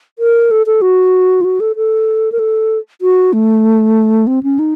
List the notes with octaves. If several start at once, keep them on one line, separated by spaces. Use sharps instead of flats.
A#4
A4
A4
F#4
F4
F#4
A4
A4
A#4
A4
F#4
A3
C4
C#4
D#4